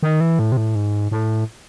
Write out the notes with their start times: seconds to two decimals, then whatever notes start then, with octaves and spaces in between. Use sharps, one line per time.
0.03 D#3
0.20 E3
0.39 A2
0.52 C3
0.57 A2
0.75 G#2
1.11 A2